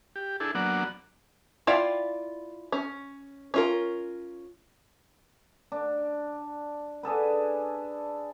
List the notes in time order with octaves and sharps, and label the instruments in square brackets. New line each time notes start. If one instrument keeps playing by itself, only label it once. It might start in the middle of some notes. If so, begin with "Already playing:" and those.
[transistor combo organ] G4
D4 E4 G#4 A4
F#3 A#3 B3 D4 D5 F#5
[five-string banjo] E4 F4 D5 F5 G5
C#4
C#4 F4 A#4
[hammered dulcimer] D4
D4 G#4 A4 B4